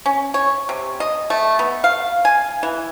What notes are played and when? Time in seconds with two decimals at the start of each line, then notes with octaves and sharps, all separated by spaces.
0.06 C#4
0.34 C#5
0.69 C3
1.00 D#5
1.30 A3
1.59 B3
1.84 F5
2.25 G#5
2.63 E3